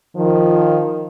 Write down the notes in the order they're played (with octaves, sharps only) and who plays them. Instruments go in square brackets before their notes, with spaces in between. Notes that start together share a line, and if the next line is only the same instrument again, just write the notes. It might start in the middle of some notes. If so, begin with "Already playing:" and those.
[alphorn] D#3 [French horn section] F3